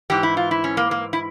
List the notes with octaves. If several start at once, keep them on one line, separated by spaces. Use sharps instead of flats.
G#2 E3 G4
E4
F4
E4
C#4
A#3
A#3
E4